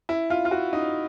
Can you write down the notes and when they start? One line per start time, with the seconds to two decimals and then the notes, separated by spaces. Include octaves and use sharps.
0.09 E4
0.30 F4
0.45 F4
0.51 F#4
0.73 D#4